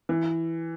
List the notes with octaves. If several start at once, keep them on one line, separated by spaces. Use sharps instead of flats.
E3